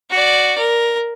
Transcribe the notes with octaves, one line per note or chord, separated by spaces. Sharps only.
F#4 D5
A#4